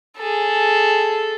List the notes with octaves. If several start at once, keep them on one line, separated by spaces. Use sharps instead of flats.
G#4 A4